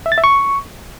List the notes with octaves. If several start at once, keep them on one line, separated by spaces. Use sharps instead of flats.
E5
A6
E5
C#6